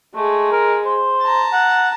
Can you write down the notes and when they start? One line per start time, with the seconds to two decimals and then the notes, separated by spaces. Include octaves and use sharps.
0.15 G#3 A3
0.52 A#4
0.85 C5
1.22 A5 A#5
1.53 F#5